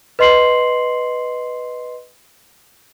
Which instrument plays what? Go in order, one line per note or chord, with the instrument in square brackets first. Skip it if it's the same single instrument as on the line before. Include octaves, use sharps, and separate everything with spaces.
[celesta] B4 D#5 C6 C7 F#7